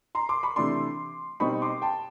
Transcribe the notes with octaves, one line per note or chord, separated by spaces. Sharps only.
A#5 C6
C6 D6
B5 C#6
C3 E3 A3 D4 C6 D6
B2 G3 C4 D#4 B5 C#6
C6 D6
G5 A5